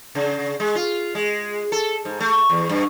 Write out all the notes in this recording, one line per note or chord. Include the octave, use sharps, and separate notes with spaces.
C#3
G#3
F4
G#3
A4
G#2
A3
E2
G2